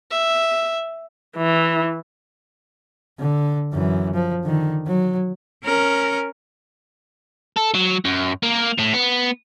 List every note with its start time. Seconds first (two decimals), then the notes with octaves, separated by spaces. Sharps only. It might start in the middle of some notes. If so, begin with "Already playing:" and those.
0.11 E5
1.37 E3 E4
3.19 D3
3.73 F#2 E3
4.14 F3
4.44 D3 D#3
4.87 F#3
5.63 C#4 A#4
7.57 A4
7.75 F#3
8.05 F#2
8.43 A#3
8.79 A2
8.94 B3